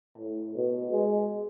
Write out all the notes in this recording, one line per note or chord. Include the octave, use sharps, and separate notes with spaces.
A2
B2
G#3